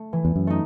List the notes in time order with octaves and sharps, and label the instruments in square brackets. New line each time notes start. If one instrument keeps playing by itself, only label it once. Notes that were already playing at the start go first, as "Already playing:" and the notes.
Already playing: [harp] A3
E3
[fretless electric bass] E2
F#2
[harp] A3 D#4